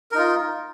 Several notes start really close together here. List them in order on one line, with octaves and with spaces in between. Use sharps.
A#4 D#4 F4